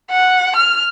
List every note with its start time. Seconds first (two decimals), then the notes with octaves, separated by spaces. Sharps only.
0.11 F#5
0.56 F6